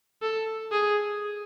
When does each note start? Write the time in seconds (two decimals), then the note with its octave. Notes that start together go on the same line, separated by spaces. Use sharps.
0.22 A4
0.72 G#4